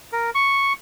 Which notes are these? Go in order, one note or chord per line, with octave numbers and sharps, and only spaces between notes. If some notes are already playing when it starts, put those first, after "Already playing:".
A#4
C#6